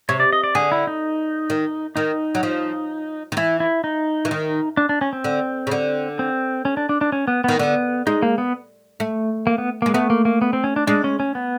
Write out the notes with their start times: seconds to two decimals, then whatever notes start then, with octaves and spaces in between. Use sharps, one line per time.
0.09 C3 C#5
0.20 D5
0.33 D#5
0.44 D5
0.55 D3 G#4
0.72 E4
0.87 D#4
1.50 D#3
1.96 D#3 D#4
2.35 F#3
2.43 F3
3.32 D#3
3.37 E3 E4
3.60 E4
3.84 D#4
4.25 E3
4.31 D#3
4.77 D4
4.89 D4
5.01 C#4
5.13 C4
5.24 D3
5.67 C#3
5.71 D3
6.19 C4
6.65 C#4
6.77 D4
6.89 D4
7.01 D4
7.12 C#4
7.28 B3
7.44 D#3 B3
7.59 D3 B3
8.07 G#3 D#4
8.23 A#3
8.38 B3
9.00 A3
9.47 A#3
9.58 B3
9.82 G#3 A#3
9.94 A3 B3
10.10 A#3
10.25 A#3
10.42 B3
10.53 C4
10.64 C#4
10.76 D4
10.87 G#3 D4
11.04 C#4
11.20 C#4
11.35 B3